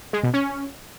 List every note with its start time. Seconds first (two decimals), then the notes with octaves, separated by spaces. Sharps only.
0.13 G#3
0.23 B2
0.34 C#4